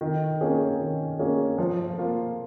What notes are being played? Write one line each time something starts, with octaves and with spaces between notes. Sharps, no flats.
D#3
A#3 C#4 G#4
D#3
A#3 C#4 G#4
F3
A#3 F4